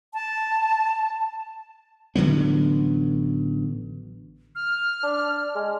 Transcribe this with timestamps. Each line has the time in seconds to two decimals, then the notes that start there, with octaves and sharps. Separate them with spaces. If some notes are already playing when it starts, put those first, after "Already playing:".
0.14 A5
2.16 A1 D3 F#3 B3
4.55 F6
5.03 D4
5.55 G#3